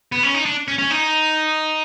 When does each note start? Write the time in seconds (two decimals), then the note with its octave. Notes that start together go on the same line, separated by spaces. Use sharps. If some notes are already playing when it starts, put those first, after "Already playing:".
0.12 B3
0.23 C#4
0.34 D#4
0.45 D4
0.68 C#4
0.79 C#4
0.91 D#4